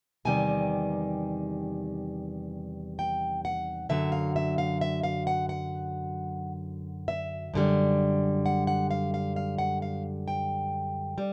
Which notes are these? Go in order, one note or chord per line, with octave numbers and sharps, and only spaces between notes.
E2 C3 D#3 G3 G#5
G5
F#5
F#2 D3 F#3 E5
F5
E5
F5
E5
F5
F#5
F#5
E5
F#2 D3 G3
F#5
F#5
F5
F5
F5
F#5
F5
G5
G3